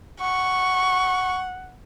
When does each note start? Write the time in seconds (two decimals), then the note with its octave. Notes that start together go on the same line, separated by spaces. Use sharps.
0.21 F#5 C#6